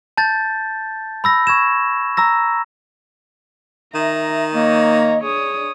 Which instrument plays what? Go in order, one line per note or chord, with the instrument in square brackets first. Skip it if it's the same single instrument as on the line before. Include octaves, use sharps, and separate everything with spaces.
[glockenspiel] A5 G6 A6
B5 E6 A#6
C#6 G#6 E7
A#5 E6 A#6
[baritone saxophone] D#3 [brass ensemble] E5 [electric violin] A#5
[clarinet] A#3 [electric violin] C#5 A#5 [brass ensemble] D#5
[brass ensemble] D4 G#4 [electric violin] C#5 D#6